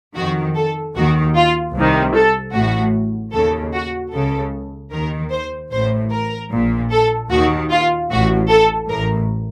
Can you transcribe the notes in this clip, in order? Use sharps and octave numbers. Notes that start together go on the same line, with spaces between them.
F2 D#3 F#4
A4
D#2 D#3 F#4
F4
C2 C3 D#3
A4
A1 A2 F#4
D#2 C#3 A4
F#4
C#2 C#3 A4
D#2 D#3 A#4
C5
A1 A2 C5
A#4
A#1 A#2
A4
D#2 D#3 F#4
F4
A1 A2 F#4
A4
A1 A2 A#4